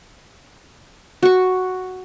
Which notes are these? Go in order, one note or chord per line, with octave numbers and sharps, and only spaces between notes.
F#4 C#6